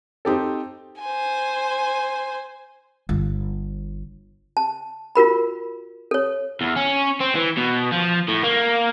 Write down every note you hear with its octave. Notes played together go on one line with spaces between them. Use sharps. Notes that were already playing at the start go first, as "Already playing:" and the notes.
C4 D#4 G4 A4
C5 G#5
G1
A5
F4 F#4 A#4 B5
A4 C#5
E2
C#4
C4
E3
B2
F3
A2
A#3